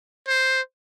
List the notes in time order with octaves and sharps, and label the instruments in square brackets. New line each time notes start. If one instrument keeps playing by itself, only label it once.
[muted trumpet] C5